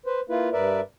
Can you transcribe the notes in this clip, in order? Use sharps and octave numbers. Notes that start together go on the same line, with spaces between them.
B4 C5
A#3 E4 F4 B4
G2 A#4 B4 D5 E5